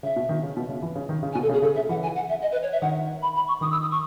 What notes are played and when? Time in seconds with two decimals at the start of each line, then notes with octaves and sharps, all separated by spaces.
0.03 C#3 E5
0.16 B2
0.29 D#3
0.43 C#3
0.57 B2
0.69 C#3
0.82 E3
0.96 C#3
1.09 D#3
1.23 C#3
1.32 G#5
1.35 B2
1.42 A4
1.49 C#3
1.53 G#4
1.62 C#3 A4
1.75 C#3 E5
1.89 E3 F#5
2.02 G#5
2.15 F#5
2.29 E5
2.42 D#5
2.51 B4
2.62 C#5
2.72 E5
2.82 D#3 F#5
3.22 B5
3.35 B5
3.48 C#6
3.61 D#3 D#6
3.71 E6
3.81 D#6
3.91 C#6